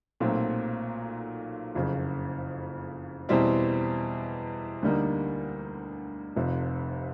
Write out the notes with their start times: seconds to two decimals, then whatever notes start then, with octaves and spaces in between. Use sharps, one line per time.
0.20 B1 A#2 F#3 A3 C4
1.75 F#1 F2 C#3
3.29 E2 B2 G3 C4 E4
4.83 D2 D3 G3 A#3 D#4
6.36 F1 F2 C3